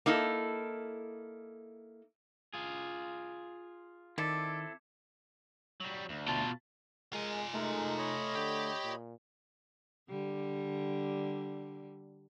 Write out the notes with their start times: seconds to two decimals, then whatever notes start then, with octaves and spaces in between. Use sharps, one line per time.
0.06 A#3 D#4 E4 A4
2.54 F4 G#4
4.18 D#3 C4 E4 A4 D5
5.80 F#3 G3
6.09 D2
6.28 B2 F4 A5
7.13 G#3 F4 A#4 G#5
7.54 G#3 A3 D#4 A#4
7.98 C#5 D#5 B5
8.35 D3 G4
8.84 A#2
10.09 D3 G3